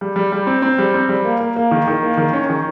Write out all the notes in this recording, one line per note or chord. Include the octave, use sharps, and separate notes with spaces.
G3
G3
G3
C4
C4
G3
C4
G3
A#3
A#3
A#3
D#3
D#3
A#3
D#3
C#4
D#3